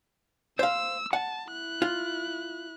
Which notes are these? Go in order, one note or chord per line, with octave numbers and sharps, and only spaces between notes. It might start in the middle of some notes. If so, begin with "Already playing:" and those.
C5 F5 E6
F#5 A5
E4 F#6
F4